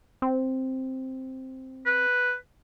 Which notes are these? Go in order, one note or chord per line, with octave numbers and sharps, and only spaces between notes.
C4
B4